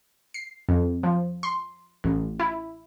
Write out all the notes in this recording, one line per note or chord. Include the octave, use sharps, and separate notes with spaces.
C7
F2
F3
C6
A1
E4